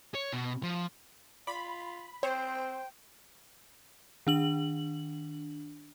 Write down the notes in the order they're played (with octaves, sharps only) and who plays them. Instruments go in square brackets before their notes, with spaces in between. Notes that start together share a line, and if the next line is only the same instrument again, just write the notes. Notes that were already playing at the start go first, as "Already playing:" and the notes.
[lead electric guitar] C#5
B2
F3
[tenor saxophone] F4 [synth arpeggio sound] D5 [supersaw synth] B5
[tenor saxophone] C4 [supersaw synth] C5 [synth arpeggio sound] C#5 [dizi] G5
[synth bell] D#3 D4 F#7